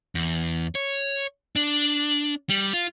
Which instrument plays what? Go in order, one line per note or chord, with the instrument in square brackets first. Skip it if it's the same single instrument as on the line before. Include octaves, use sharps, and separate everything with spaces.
[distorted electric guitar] E2
C#5
D4
G3
F4